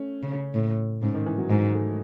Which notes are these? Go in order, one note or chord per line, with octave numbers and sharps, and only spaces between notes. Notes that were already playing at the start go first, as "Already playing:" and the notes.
Already playing: A3 C#4
C#3
A2
G#2 C#3
D#3
E3
F#3
G#2 G#3
A3